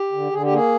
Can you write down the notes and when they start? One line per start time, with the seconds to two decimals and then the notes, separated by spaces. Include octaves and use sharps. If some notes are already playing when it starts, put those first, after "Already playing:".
Already playing: G4
0.12 D3
0.31 D3 G#4
0.43 G4
0.51 A#3 G#4